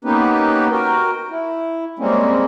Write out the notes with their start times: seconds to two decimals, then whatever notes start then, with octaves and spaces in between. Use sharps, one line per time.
0.05 A#3 B3 C#4 D#4 G4 B4
0.71 F#4 A#4 G5
1.31 E4
1.99 G3 G#3 A#3 C4 C#4